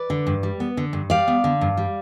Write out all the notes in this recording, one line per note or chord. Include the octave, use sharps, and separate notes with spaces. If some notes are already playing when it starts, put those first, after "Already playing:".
Already playing: B4 D5
D3
G2
G3
B3
D3
G2
G3 D5 F5
B3
D3
G2
G3